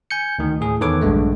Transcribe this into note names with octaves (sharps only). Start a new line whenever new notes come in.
G#5 G6 C#7
D2 D#3
A2 G#4
E2 D#3 A4 B4 C#5 D6
A#1 G2 D3 G#3 A3